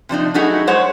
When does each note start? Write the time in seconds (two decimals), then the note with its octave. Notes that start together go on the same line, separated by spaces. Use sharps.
0.09 C3 F3 D4 D#4
0.34 F#3 A3 D#4 E4 F#4 G#4
0.67 G#3 C5 C#5 F#5